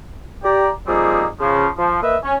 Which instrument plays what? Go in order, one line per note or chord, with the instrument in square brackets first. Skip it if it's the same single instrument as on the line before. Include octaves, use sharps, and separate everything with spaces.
[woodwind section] G4 D5 A#5
F3 G3 A#3 C4 D#4 G#4
C#3 F3
F3
A#3 B4 D#5 E5
C#4